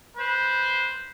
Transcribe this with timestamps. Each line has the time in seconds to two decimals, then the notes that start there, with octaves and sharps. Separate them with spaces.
0.17 B4 C5